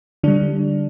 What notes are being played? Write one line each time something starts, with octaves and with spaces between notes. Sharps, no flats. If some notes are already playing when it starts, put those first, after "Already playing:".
D3 G3 D4